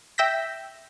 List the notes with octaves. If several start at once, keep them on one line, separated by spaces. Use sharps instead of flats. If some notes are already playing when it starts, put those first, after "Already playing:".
E5 G5 E6 G6 A#6 B6